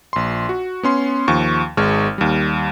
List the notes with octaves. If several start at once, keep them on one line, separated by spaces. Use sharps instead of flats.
A#1 C6
F#4
B3 C#4 C6
D#2 F3 C#6
G#1 G#3 C#6 F6
D#2 G3